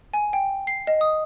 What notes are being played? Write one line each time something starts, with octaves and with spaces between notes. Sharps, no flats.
G#5
G5
C7
D#5
D#6